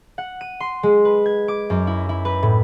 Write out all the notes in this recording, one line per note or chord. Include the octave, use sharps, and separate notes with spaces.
F#5
D#7
C6
G#3
B4
G#6
D6
F#2
E4
E4
B4
A2